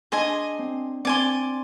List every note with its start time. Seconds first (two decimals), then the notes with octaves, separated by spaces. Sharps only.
0.12 D4 G#4 D#5 G#5 C6
0.59 C4
1.05 C4 D5 G#5 C6